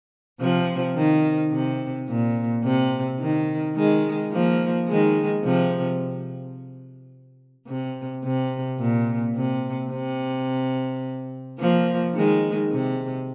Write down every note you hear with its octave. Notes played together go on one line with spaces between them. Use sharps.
C3 F3
D#3
C3
A#2
C3
D#3
D#3 G#3
F3 A#3
D#3 G#3
C3 F3
C3
C3
A#2
C3
C3
F3 A#3
D#3 G#3
C3